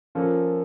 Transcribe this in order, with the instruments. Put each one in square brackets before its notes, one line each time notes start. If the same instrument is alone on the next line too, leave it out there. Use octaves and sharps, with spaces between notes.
[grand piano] F3 A#3 C#4 F4 A4